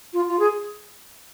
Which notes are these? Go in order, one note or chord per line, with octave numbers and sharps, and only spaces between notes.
F4
F4
G#4